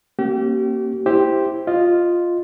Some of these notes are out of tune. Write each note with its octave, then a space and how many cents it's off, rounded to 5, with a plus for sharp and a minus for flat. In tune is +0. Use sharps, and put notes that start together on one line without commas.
A#3 +0 C#4 -40 G4 -35
E4 +0 G4 +0 C5 +0
F4 +0 D#5 -10